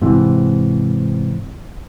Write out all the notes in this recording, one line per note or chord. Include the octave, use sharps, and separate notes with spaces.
G#2 C3 E3